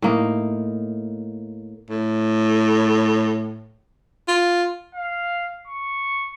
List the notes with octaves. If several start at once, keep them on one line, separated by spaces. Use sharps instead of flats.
A2 A#3 D#4
A2
F4
F5
C#6